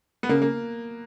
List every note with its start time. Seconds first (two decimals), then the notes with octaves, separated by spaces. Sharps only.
0.23 B3
0.29 C#3 A#3
0.42 A#3